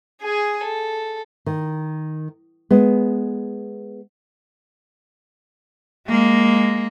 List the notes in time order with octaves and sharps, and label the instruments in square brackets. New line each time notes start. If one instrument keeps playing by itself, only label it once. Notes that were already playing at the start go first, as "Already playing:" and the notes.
[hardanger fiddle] G#4 G#5
A4
[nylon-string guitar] D#3
G#3 B3
[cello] G#3 A#3